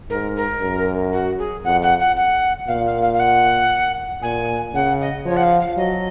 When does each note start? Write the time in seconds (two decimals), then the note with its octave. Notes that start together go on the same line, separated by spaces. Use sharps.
0.10 G#2 A#4
0.36 A#4
0.61 F#2
1.13 F#4
1.38 G#4
1.64 F2 F#5
1.82 F#5
2.00 F#5
2.16 F#5
2.68 A#2 F5
2.86 F5
3.02 F5
3.13 F5
3.19 F#5
4.22 A#2 G#5
4.74 C#3 F#5
5.01 D#5
5.25 F3 C#5
5.36 F#5
5.43 F5
5.60 F5
5.77 F#3 D#5